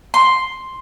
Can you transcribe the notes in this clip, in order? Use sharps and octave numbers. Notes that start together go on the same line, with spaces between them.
C6